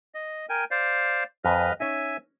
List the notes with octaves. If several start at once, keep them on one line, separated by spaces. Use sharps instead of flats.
D#5
A#4 G5 G#5
C5 D5 F5
F2 B4 D#5 G#5 F6
C#4 D#4 E5 G#5